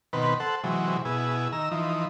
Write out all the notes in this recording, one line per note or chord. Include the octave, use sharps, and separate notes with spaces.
B2 D#3 C4 B4
A4 C5 F#5
C3 E3 F#3 G#3
B2 E4 G#4
D#3 A#5 E6
E3 F3 D#4